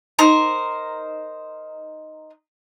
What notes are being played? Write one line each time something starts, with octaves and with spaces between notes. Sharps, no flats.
D#4 A#4 C5